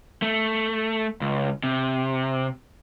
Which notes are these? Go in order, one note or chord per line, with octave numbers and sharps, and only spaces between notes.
A3
C#2
C3